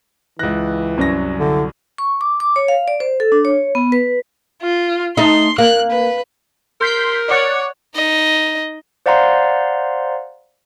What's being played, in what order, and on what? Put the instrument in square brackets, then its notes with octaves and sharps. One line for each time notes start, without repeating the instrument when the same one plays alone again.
[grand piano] C#2 A#6 [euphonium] E3 [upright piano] F#6
[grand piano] C2 F#3 A#6 [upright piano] F#2
[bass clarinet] D3 [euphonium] E4
[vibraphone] C#6
D6
D6
C#5
F5
D5
C5
A4
D4
C#5
B3
B4
[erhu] F4
[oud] A3 D#4 [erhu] C6
[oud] A#3 [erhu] F#6
[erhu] B4
[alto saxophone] A#4 [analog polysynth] C6 G6 B6
[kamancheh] C#5 [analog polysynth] D5 F#5
[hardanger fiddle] D#4 D#5
[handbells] C5 D5 F5 F#5 A#5 C6